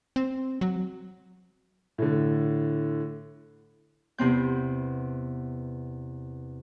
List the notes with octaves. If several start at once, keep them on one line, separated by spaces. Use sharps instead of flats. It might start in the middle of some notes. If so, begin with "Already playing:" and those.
C4
F#3
A2 D3
E2 C3 B3 C4 G6